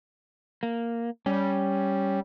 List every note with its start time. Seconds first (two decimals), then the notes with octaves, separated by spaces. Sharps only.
0.63 A#3
1.26 G3 C#4